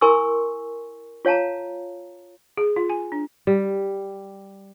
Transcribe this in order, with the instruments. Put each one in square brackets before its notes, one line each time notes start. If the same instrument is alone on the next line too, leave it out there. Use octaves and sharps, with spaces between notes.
[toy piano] E4 A#4 G#5 C6 C#6 E6
F4 C#5 F5 A5 A#5
[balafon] G#4
F4
G#5
D4
[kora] G3